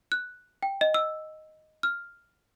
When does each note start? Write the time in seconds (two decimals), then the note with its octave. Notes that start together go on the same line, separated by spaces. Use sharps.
0.12 F#6
0.63 G5
0.81 D#5
0.94 E6
1.83 F6